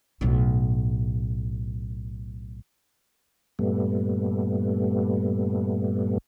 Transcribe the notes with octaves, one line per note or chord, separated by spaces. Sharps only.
B1 A2
G2 A#2 G3 A3 B3